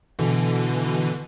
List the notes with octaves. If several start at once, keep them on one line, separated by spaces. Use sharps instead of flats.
B2 D3 E3